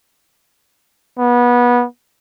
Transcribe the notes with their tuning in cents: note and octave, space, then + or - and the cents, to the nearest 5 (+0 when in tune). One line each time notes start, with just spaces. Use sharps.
B3 -25